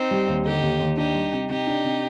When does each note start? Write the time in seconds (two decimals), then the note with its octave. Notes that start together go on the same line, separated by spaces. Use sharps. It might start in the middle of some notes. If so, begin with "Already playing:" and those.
Already playing: C4 D#4
0.11 G3
0.28 D#2
0.45 D3 D#4 G4
0.62 D#2
0.80 D#2
0.97 D4 D#4 G4
1.15 G3
1.33 C3
1.49 C3 D#4 G4
1.67 D4
1.84 C3